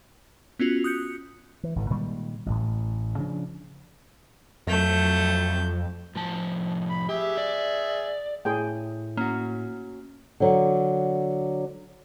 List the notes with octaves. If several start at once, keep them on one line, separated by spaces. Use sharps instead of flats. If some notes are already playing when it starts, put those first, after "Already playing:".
B3 C#4 F4 F#4
D#6 F#6 G6 C#7
E3
G#1 A2 D3
A#2 D#3 G3 G#3
A1 A2
C#3 F3 D4
F2 F#3 A3 G6
A2 F3 A5
B5
G4 G#4 E5
D5
A2 G#4 G5
A#3 C#4 F#4
D3 F#3